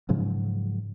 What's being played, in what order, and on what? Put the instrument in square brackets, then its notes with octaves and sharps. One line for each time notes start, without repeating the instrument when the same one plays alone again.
[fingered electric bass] G#2 C#3 F3 F#3